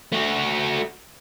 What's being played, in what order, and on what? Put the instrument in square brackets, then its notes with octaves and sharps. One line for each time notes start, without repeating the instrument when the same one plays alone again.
[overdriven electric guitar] A3 F#4